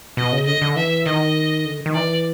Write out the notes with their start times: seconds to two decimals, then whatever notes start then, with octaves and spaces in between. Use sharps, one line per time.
0.17 B2 D#5
0.32 C#3
0.46 D3 D#5
0.62 D3
0.76 E3 E5
1.05 D#3 D#5
1.65 D3
1.86 D#3
1.94 E3 D5